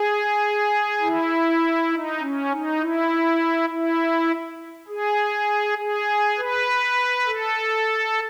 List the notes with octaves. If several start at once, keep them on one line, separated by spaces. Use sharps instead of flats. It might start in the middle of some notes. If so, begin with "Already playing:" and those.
Already playing: G#4
E4
D#4
C#4
D#4
E4
E4
G#4
G#4
B4
A4